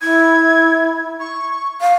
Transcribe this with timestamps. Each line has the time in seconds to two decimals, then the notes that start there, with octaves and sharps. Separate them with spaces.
0.01 E4 G#6
1.19 C#6
1.81 F5